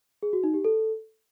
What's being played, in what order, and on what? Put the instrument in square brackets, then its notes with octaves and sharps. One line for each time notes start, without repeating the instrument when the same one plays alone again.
[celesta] G#4
F#4
D#4
G4
A4